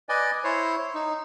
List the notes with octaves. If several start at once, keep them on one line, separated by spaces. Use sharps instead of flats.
B4 D5 D#5 G#5
E4 C5 C#5
D#4